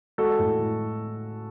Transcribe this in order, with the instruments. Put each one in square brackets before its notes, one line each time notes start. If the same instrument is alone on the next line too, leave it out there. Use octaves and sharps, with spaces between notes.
[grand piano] G#3 F#4 A4
A2
A2